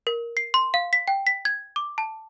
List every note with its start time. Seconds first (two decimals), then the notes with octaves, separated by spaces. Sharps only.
0.07 A#4
0.37 C7
0.54 C6
0.74 F5
0.93 B6
1.08 G5
1.27 B6
1.45 G#6
1.76 D6
1.98 A5